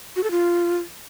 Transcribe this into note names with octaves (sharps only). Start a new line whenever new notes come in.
F#4
A4
F4